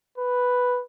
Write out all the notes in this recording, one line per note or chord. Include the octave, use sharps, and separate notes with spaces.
B4